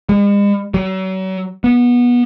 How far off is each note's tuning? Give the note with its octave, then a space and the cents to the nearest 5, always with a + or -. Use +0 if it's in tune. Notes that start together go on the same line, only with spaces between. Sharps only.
G#3 -45
F#3 +35
B3 -20